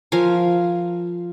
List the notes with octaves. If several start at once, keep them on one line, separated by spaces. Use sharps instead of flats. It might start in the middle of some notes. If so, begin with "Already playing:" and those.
F3 A#4 F5 G#5